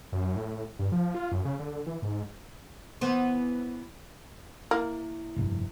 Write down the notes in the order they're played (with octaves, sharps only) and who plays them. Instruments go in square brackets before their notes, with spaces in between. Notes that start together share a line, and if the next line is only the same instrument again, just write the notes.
[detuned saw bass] F#2
A2
G2
F3
F4
F#2
C#3
D3
E3
G#2
[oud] E3 B3 C5
[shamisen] A#3 [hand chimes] E4
[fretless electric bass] F1 A#1 G2